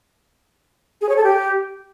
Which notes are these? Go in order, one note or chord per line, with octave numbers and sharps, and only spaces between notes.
G#4
C#5
A4
G4